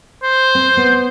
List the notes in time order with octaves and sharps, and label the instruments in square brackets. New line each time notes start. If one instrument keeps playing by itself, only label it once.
[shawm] C5
[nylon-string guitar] C4
B3